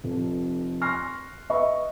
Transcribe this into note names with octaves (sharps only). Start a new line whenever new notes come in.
F1 F2
C6 C#6 F6 F#6 A#6 C7
B4 D#5 E5 B5 C#6